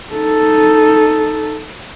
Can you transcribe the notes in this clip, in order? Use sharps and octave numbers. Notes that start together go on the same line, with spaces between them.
D#4 A4